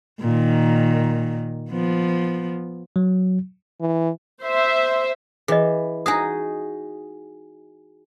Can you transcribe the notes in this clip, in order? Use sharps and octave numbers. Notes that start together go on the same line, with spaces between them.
A#2 D#3
F3 B3
F#3
E3
C5 E5
E3 G#4 D#5
D#4 F#4 G#4 G#5 D#6